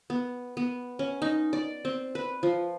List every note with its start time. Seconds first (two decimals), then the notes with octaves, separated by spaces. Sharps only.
0.10 B3
0.57 B3
0.99 C#4
1.22 D#4
1.53 D5
1.85 C4
2.15 B4
2.43 F3